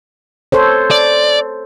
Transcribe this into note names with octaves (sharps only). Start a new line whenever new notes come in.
A4 C5 C#5
D5